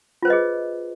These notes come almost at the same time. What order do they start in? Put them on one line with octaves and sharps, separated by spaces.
F4 C5 B4 D#5 G#4